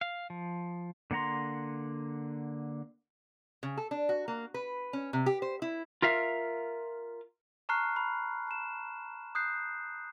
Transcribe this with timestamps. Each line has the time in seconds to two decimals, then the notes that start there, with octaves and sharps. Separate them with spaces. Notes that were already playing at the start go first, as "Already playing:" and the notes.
0.01 F5
0.30 F3
1.11 D3 A#3 F#5 A#5 C6
3.63 C#3
3.77 A4
3.91 D4
4.09 F#4
4.28 A#3
4.54 B4
4.93 C#4
5.13 C3
5.26 G4
5.42 C5
5.62 E4
6.02 F4 A#4 E5 F5
7.69 A5 A#5 C#6 F6 F#6 C7
7.96 B5
8.47 A5 E7
9.35 D#6 F#6 G6 C7